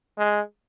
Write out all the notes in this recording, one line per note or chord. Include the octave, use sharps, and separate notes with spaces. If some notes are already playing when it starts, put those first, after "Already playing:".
G#3